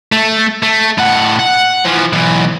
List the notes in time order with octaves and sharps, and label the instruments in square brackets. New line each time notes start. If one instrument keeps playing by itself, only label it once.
[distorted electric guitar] A3
A3
A2 F#5
F#5
E3 F3
B1 E3